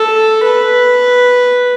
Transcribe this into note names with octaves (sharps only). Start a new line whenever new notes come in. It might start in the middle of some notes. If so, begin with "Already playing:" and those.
Already playing: A4
B4